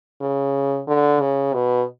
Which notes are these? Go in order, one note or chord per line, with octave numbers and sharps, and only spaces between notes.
C#3
D3
C#3
B2